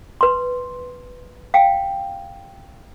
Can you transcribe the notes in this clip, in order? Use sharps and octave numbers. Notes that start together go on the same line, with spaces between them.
B4 C6
F5 G5